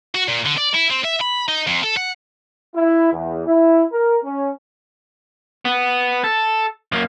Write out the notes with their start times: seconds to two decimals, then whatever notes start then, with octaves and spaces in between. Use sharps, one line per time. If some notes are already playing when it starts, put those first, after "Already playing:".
0.15 F#4
0.28 A#2
0.46 D3
0.58 D5
0.74 E4
0.91 C4
1.04 E5
1.21 B5
1.48 D#4
1.67 F2
1.83 A4
1.97 F#5
2.76 E4
3.13 E2
3.47 E4
3.92 A#4
4.24 C#4
5.65 B3
6.24 A4
6.92 F#2 A#3